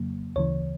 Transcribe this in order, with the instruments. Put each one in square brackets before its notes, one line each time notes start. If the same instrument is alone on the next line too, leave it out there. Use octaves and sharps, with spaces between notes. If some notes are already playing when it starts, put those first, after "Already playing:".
Already playing: [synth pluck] F2 C#3 F#3 A#3
D2 C#3 E3 C#5